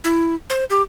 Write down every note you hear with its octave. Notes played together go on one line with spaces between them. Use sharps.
E4
C5
G4